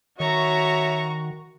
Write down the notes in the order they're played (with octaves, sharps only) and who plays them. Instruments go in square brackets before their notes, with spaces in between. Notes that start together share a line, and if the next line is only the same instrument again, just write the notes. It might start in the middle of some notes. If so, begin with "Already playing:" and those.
[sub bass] D#3 [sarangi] F#4 [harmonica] C#5 E5 [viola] A#5 C#6